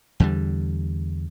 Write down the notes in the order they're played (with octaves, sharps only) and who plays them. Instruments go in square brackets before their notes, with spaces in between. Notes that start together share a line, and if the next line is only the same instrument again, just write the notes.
[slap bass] E2 D3 G3